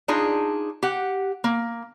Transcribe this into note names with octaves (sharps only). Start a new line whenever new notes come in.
D4 D#4 F4 G#4
G4 F#5
A#3